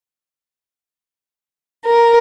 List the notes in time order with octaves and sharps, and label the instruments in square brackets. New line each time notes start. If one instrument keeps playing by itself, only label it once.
[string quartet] A#4